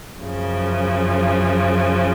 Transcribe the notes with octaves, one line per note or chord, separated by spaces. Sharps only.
F#2 C#3 F3